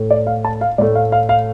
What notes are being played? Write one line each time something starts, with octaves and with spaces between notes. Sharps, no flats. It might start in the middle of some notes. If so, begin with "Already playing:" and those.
Already playing: A2 A3
D5
F5
A5
F5
A2 A3 D5
F5
F5
F5